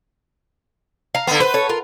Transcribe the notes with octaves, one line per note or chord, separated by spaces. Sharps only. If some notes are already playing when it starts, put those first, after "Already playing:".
F5 A#5
D3 B3
B4 C5
A4 C#5
F4 A#4